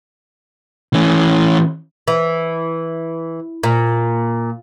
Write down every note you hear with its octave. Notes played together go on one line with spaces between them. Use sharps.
E3 C#4
E3
A#2